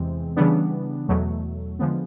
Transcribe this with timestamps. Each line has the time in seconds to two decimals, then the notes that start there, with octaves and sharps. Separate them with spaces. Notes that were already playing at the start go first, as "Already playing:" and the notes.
Already playing: E2 C3 E3 G#3 C4
0.36 C#3 E3 G3 B3 D4
1.08 E2 B2 F#3 A3
1.79 D3 F3 G#3 B3